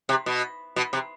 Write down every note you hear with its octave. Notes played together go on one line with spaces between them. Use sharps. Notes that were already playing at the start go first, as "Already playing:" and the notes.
C3
B2
B2
C3